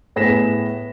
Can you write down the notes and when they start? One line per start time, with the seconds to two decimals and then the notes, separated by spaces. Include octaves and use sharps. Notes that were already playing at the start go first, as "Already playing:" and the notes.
0.16 A2 B3 G#4 A#6 B6 E7